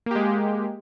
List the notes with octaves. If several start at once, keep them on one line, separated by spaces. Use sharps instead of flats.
G#3 A#3 G4